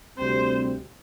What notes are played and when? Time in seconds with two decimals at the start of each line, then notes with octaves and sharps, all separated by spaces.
0.18 D2 C3 G3 C4 C5